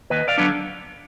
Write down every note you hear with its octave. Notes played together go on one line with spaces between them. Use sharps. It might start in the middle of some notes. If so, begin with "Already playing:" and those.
D#2 B4 D#5
D5 F5
D3 F#3 B3 D4